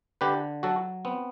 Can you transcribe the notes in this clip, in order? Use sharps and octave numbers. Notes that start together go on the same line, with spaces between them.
D3 G4 B4
F#3 F#4 A4
B3 C4